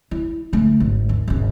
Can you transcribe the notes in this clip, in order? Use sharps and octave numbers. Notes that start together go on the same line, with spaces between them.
E4
D3 A3
G#1
D#2
G#1 C#3